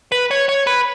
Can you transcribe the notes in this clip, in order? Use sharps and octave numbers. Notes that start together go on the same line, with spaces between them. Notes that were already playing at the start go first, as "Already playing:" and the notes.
B4
C#5
C#5
B4